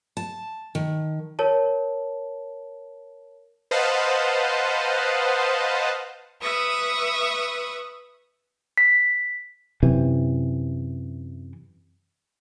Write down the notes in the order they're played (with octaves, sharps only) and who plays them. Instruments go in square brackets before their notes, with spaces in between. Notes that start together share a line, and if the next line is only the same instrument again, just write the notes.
[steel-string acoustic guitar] A5
D#3
[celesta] A#4 C#5 A5
[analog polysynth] B4 C5 D#5 F5 F#5 A5
[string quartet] B4 E5 C#6 D#6
[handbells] B6
[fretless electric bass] F#2 C3 E3